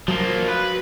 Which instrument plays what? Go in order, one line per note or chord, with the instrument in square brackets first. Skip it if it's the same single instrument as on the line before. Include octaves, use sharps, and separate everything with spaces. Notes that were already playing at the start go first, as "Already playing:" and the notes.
[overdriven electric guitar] F3 A#3 [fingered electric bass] F#3
[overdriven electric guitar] B4